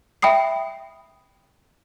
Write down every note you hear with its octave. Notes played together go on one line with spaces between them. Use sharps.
E5 G5 B5 D#6 C7